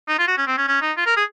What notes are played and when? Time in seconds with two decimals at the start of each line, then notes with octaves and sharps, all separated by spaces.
0.09 D#4
0.19 F4
0.28 F#4
0.38 C#4
0.47 C4
0.57 C#4
0.68 C#4
0.82 D#4
0.97 F4
1.06 A#4
1.17 G#4